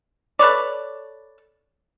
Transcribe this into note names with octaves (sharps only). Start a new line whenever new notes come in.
A4 B4 C#5 D5